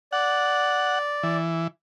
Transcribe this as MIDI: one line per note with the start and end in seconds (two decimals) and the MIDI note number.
0.13 1.37 74
0.13 0.99 78
1.23 1.67 52